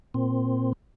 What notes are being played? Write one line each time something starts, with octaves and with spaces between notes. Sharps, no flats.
A#2 C4